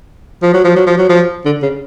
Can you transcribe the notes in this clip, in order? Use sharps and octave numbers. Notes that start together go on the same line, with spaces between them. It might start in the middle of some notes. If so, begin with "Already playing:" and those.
F3
F#3
F3
F#3
F3
F#3
F3
D3
C#3